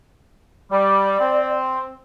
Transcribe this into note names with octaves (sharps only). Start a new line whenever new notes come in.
G3 D5
C4